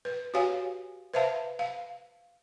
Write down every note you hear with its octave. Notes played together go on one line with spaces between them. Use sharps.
B4
F#4 G4 C#5 F5 G#5
B4 C5 E5 F5 A5
F5